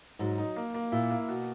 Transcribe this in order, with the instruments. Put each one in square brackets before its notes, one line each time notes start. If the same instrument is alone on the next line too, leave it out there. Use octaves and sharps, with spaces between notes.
[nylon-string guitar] G#2 [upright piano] F#3
[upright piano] D#4
A#3
A#3
[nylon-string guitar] A#2 [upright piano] E4
[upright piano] A#3
B2